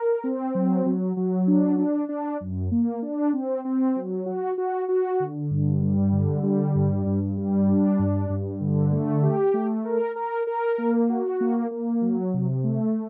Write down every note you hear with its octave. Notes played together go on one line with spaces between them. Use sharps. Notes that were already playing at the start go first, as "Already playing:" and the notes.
Already playing: A#4
C4
F#3
F#3
F#3
D4
D4
D4
F#2
A#3
D4
C4
C4
F#3
F#4
F#4
F#4
D3
G2
G3
D3
G3
G2
G2
G3
D4
G2
G2
D3
A3
G4
A3
A#4
A#4
A#4
A#3
F#4
A#3
A#3
F#3
C3
A3